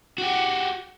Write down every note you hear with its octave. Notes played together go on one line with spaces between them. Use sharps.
F#4 G4